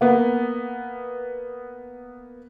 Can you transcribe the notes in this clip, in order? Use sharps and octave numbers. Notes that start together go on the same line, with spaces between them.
A#3 B3